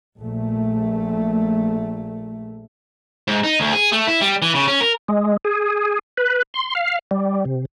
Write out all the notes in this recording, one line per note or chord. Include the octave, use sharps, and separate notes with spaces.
A#1 A3
G#2
D#4
D2
G#4
A3
E4
G3
E3
C#3
C#4
A#4
G#3
G#4
B4
C6
F5
G3
C3